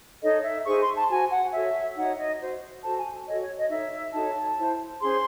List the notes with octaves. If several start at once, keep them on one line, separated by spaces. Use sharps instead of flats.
D#4 A4 C#5 D#5
E5
D#4 G#4 C5 C#6
C6
A5
F#4 C5 G#5
F#5
F#4 A4 C#5 E5
D#4 F#4 C#5 F#5
D#5
F#4 C5
F#4 A4 C5 A5
G#5
F#4 A4 C#5 D#5
C#5
D#5
D#4 A4 C#5 E5
D#4 F#4 A4 C#5 A5
E4 C5
C#4 G#4 C5 C6